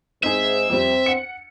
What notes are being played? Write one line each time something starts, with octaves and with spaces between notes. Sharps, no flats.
G#2 C4 D#4 G#4 E5
F2 G3 C4
F#5 C#7